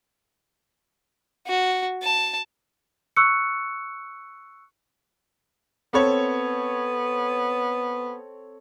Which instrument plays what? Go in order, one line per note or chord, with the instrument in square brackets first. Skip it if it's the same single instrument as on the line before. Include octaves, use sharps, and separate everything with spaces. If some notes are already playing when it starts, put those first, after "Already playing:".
[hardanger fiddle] F#4
A5
[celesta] C#6 E6 F#6 C#7
[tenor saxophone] B3 [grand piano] C4 A4 C#5